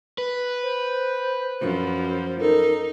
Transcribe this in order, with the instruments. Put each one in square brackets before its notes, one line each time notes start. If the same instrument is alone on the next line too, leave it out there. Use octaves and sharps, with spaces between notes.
[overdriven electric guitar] B4
[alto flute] C5
[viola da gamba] F#2 F3 [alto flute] C5
[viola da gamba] D#4 [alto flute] A4 [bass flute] A#4